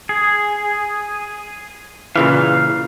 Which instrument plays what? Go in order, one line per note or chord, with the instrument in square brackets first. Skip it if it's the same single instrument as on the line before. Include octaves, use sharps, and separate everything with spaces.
[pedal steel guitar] G#4
[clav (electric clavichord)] A#2 C#3 E3 [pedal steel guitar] F5